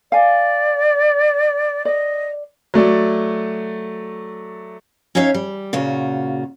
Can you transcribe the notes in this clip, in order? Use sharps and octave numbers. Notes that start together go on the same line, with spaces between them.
D5 F5 G#5
D5 D#5
F#3 A3 D5
C#4 D#4 C#5 E5 F5
G3
A#2 C#3 F4 F#4